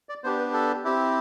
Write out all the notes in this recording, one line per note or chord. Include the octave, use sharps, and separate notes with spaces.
D5
B3 D4 G4 C5
B4
A4
C4 E4 G4